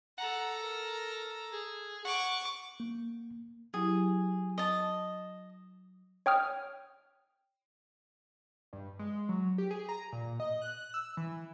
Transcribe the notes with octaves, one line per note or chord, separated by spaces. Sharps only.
A4 F#5 A#5
A#4
G#4
F#5 C#6 D6
A#3
F#3 E4 G4 G#4
D#5 A5
C#5 G5 D#6 F6
G2
G#3
F#3
G4
G#4
A#5
A#2
D#5
F#6
E6
E3